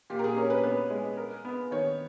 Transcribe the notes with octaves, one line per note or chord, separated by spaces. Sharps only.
A#2 G4
A#4
G#4
C#4 A#4
B4
B3 B4
G#3
A#4
B3
D#3 C#5